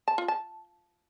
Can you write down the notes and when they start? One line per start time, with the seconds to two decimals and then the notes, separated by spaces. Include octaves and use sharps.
0.08 A5
0.18 F4
0.28 A5